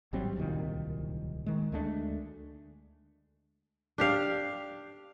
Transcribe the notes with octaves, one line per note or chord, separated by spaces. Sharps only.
G#1 F#3 G3 C4
D1 C2 A#2 D#3
D#3 G#3
D2 G#3 A3 D4
D4 G4 F5